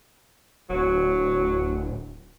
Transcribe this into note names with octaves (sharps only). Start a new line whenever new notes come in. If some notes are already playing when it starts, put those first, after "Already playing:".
D1 F#3